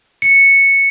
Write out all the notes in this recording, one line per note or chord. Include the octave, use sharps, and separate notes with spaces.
C#7